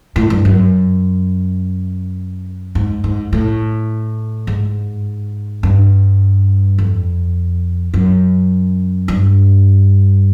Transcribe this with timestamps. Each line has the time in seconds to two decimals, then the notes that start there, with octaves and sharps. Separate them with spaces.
0.16 A2
0.30 G2
0.45 F#2
2.75 G#2
3.04 G#2
3.33 A2
4.47 G#2
5.63 G2
6.78 F2
7.94 F#2
9.08 G2